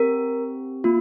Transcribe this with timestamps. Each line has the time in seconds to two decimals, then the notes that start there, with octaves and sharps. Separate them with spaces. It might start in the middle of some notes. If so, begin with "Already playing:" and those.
Already playing: C4 G4 A#4
0.84 A#3 F4